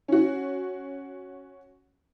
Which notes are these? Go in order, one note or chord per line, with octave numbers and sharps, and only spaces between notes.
C#4 F#4